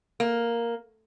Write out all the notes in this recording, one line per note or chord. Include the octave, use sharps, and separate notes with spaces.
A#3